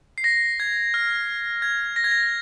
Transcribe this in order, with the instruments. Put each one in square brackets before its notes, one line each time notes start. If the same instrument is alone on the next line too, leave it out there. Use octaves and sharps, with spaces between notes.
[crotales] C7
A#6
G#6
F6
G#6
A#6
G#6
A#6